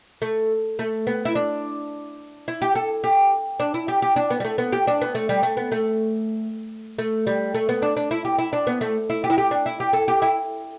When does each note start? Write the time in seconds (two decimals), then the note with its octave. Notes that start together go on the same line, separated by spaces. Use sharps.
0.22 A3
0.79 A3
1.07 B3
1.25 E4
1.35 D4
2.48 E4
2.62 G4
2.75 A4
3.04 G4
3.60 D4
3.74 E4
3.88 G4
4.02 G4
4.16 D4
4.31 B3
4.40 G3
4.45 A3
4.58 B3
4.73 G4
4.87 D4
5.02 B3
5.15 A3
5.29 G3
5.43 A3
5.57 B3
5.72 A3
6.98 A3
7.27 G3
7.55 A3
7.69 B3
7.82 D4
7.97 D4
8.11 E4
8.25 G4
8.38 E4
8.53 D4
8.67 B3
8.81 A3
9.10 E4
9.24 G4
9.30 E4
9.38 G4
9.51 D4
9.66 E4
9.80 G4
9.93 A4
10.08 G4
10.22 E4